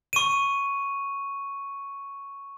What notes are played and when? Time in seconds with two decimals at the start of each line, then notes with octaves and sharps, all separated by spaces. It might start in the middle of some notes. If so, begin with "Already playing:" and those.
0.13 C#6 D#7